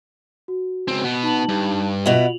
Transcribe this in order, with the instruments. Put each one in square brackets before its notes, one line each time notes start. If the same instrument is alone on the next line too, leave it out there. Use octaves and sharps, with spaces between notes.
[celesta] F#4
[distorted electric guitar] C#2 C4
B2 B3
[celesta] D#4 A5 F#7
[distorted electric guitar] G2
[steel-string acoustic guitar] B2 B3 E4 [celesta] F4 F7 F#7